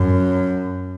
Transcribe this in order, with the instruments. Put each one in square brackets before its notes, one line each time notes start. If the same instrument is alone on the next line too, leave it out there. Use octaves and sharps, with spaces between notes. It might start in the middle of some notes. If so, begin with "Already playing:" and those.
Already playing: [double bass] F#2